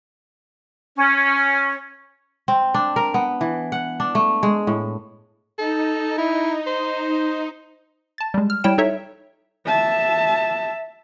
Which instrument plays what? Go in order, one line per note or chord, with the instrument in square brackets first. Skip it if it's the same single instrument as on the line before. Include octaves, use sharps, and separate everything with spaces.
[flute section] C#4
[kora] C4
D4
A#4
B3
E3
F#5
D4
A3
G#3
A2
[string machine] D#4 [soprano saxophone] A4
[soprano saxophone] E4
C5
[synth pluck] A5 A6
G3 G#3
F6
G3 E4 C#5 G5 D7 E7
D#4 A4 C#5 E5
[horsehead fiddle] E5 A5